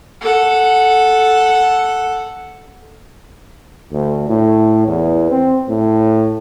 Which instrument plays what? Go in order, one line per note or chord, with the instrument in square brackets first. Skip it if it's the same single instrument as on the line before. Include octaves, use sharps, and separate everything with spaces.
[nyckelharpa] A4 F#5
[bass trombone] D2
A2
E2
C4
A2